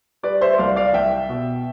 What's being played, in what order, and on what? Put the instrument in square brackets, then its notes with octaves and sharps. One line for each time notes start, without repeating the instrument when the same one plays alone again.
[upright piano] G3 B4 D5
C5 E5
C2 D5 F5
D5 F5
C2 E5 G5
B2